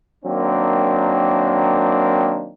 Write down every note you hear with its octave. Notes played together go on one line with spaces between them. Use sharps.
D#3 F#3 A#3 C4 D4